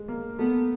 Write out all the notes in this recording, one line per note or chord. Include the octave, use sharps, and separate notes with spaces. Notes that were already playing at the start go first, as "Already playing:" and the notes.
Already playing: G#3
A#3
A3 B3